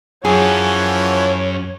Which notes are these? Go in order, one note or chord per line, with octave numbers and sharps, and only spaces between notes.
F#2 E3 F3 F#4 G#4 C#5